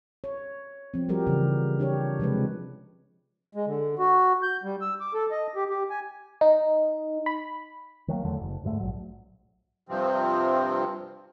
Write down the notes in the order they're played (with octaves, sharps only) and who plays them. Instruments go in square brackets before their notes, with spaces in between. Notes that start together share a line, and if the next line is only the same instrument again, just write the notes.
[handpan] C#5
F3 C4
F3 G3 F#4 G4 A#4
C#3 E3 F3 G4
D4 G4 C#5
C3 F3 G#3 B4
[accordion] G#3
D3
F#4
G6
G3
E6
D6
A4
D#5
G4
G4
G#5
[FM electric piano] D#4
B5
[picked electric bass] D#3 F#3 G#3 A#3
E2 D3 F#3 A3
F#1
D2 G#2 F#3 A3
A#1 F#3
[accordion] G2 C3 F3 C4